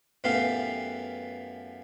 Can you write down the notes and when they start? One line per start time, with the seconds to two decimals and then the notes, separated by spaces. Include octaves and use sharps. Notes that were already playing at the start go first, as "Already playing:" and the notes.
0.24 F#2 E3 A3 B3 G4 F5